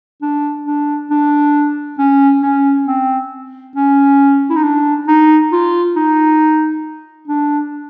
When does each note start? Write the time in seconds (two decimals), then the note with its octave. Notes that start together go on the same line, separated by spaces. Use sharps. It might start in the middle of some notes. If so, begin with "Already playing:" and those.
0.22 D4
0.66 D4
1.10 D4
1.99 C#4
2.43 C#4
2.87 C4
3.76 C#4
4.50 E4
4.56 D#4
4.63 D4
5.08 D#4
5.52 F4
5.96 D#4
7.28 D4